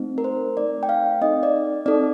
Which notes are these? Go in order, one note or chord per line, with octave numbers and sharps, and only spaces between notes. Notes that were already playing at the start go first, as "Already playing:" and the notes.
Already playing: A3 C4 D#4
A#4
C5
A3 C4 D#4 D5
G5
F5
C4 D#4 A4 D#5
D5
C4 D#4 A4 D5